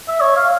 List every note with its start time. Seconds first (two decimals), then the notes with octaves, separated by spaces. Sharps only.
0.09 E5
0.21 C#5
0.37 F5